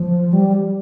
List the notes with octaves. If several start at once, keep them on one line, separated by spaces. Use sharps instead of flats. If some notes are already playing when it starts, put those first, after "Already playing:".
Already playing: F3
G3